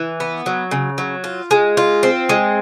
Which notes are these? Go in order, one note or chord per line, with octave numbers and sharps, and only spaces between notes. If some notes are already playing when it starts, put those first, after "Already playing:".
Already playing: E3
B3
F#3
C#3
F#3
F4
G#3
F4
C4
G#3